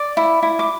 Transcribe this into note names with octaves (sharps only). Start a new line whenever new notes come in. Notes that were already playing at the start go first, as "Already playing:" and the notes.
Already playing: D5 D6
E4
E4
D6